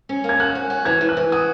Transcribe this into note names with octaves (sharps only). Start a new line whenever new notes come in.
C#4
A#3
G#6
F#4 F#6
C#4
F#4
E3 G#6
E3
F#6
E3
F#4 D#6